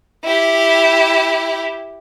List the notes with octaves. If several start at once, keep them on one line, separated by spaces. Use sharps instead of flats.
E4 G4